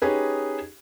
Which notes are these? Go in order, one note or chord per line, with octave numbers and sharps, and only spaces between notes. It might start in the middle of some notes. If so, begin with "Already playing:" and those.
C#4 D#4 G4 G#4 B4